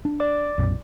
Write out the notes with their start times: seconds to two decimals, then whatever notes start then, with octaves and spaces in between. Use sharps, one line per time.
0.05 D4
0.20 D5 D6
0.58 B1 F#2 A#2